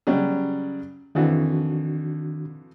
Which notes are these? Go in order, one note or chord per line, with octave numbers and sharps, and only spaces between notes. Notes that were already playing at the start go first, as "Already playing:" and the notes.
C#3 F#3 G3
F2 D#3 E3 D4 F#4